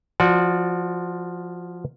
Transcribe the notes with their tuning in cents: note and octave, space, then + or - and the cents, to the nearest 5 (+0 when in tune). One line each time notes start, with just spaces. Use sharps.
F3 +0 F#4 -20 D5 +0